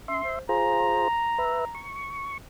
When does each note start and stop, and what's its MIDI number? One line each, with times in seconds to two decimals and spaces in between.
0.08 0.20 61
0.08 0.39 76
0.08 0.39 84
0.24 0.42 72
0.49 1.08 65
0.49 1.08 68
0.49 1.08 72
0.49 1.90 82
1.38 1.65 71
1.38 1.65 76
1.75 2.38 85